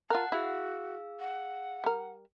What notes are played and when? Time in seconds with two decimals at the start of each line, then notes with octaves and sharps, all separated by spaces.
0.10 F4 A#4 F#5 A5 F#6
0.32 E4 F#4 G#4 F5 E6
1.20 F#5
1.84 G3 A#4